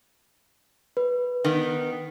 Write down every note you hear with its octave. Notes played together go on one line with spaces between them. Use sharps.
B4
D#3 B3